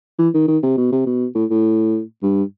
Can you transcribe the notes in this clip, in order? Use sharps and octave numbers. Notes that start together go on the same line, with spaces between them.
E3
D#3
D#3
C3
B2
C3
B2
A2
A2
G2